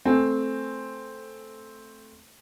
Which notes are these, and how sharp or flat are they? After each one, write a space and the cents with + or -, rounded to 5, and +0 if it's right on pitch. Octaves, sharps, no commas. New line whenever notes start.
A3 +0 C4 +0 G#5 -15